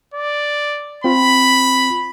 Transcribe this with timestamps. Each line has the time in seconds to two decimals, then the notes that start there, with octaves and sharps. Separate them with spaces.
0.14 D5
1.04 C4 F4 B5